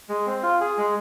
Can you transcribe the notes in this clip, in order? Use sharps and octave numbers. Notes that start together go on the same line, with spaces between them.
G#3
C4
F4
G#4
G#3